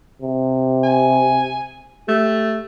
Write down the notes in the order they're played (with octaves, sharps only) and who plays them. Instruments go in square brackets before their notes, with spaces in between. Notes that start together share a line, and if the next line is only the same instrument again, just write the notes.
[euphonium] C3
[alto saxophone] G#5
[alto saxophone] A3 [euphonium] G4